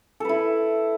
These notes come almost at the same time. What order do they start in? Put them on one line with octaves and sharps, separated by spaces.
A4 B4 E4